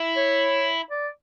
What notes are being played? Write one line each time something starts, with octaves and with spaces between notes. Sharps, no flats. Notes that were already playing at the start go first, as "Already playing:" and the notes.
Already playing: E4
C#5
D5